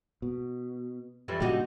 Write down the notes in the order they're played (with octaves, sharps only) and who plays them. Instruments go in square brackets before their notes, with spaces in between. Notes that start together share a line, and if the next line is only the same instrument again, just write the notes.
[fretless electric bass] B2
[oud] F2 E3 G3
[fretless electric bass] G2 A#2 C#3 [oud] D#4 F#4 G4